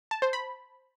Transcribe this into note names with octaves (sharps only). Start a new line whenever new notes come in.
A5
C5
B5